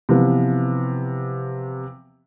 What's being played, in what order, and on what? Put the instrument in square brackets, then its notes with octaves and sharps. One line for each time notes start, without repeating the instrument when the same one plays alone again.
[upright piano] C3 E3 F3 B3